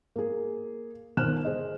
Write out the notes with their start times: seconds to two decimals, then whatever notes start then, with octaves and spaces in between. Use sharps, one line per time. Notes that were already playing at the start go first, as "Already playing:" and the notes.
0.16 A#3 G#4
1.17 G1 D#3 C5 F6 F#6 E7
1.45 G#4 C5 D#5